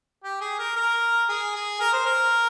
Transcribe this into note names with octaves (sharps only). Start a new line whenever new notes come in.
G4
G#4
A#4
A#4
G#4
G#4
A#4
C5
A#4